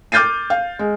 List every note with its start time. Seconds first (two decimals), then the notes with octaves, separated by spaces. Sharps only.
0.12 D6 F6 G6 A6 C7 D#7
0.50 F5
0.79 G#3